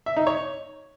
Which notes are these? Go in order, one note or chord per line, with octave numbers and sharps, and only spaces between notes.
E5
D#4
C#5